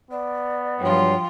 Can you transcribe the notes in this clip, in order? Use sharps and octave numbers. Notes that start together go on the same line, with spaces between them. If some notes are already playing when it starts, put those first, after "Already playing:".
B3 D5
G2 F3 F#3 F4 G5